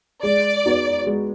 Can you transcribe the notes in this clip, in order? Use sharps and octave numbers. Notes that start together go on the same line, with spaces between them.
G#3 D5
B3 D#4 F#4
G#3